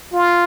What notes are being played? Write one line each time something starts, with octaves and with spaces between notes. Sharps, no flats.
F4